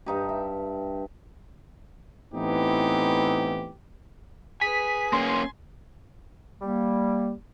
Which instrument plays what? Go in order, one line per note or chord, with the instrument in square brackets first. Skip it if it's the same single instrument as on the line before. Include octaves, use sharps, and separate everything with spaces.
[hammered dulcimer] G2 D#4 G4
E5
[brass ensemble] A2 E3 B3 C4 D#4 G4
[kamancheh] G#4 B4 [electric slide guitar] G#5 [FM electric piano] B6
[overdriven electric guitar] A#3 C#4 [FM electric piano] C6
[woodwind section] G3 A#3